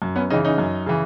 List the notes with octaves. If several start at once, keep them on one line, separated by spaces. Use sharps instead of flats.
F#2
B3 C#4
C#3 E3 C#4 D#4
C#4 D#4
F#2
C#3 E3